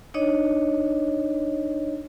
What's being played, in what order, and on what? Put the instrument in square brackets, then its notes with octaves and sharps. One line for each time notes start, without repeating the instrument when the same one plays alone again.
[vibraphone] D4 D#4 C#5 D#5